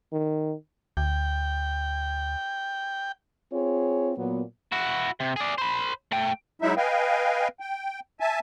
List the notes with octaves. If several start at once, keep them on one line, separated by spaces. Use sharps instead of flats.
D#3
D2 G5
C4 F4 G#4 C#5
A#2 F#3 B3
E4 F#4
C3
G#4 D5
C5 B5
A3 G5
F#3 G#3 D#4 E4 E5
B4 D#5 F5 G5 G#5
G5
E5 G#5 A5